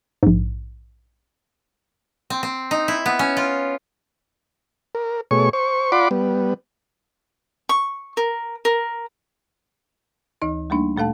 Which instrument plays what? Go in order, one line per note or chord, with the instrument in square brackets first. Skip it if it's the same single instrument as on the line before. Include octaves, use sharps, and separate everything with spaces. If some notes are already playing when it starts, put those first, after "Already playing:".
[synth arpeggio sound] A#1 G#2
[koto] C4
C4
D#4
E4
B3
C#4
F4
[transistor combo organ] A#4
B2 A3 G#4 C#5 C#6
C5 C#6
F4 D5 F#5 B5 C6 D6
G3 B3
[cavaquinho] C#6
A#4
A#4
[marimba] D2 E3 D#4 D#5
G3 A3 A#3 D4 D#4
A#2 A3 A4 F5 A5